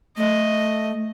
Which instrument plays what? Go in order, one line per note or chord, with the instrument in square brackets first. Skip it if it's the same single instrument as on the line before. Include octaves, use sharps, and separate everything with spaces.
[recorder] A3 [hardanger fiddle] D#5